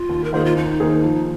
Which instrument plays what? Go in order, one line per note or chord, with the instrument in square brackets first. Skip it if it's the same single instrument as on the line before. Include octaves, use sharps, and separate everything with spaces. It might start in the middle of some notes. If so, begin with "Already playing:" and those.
Already playing: [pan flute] F4
[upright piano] D#2
[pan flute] A#4
[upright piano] D#3 A#3 F4 C5 [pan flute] G#4
[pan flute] F4
[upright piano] D#2 [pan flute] D#4
[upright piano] D#3 A#3 G#4 C5
F3